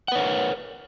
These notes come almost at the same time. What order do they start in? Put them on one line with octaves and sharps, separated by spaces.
F#5 B4 C#5 A#4